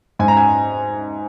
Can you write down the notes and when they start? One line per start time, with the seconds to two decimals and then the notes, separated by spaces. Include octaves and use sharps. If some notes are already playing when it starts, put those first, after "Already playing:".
0.19 G#2 G#5
0.28 A#5
0.37 G#5